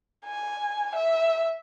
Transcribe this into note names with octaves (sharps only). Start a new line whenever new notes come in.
G#5
E5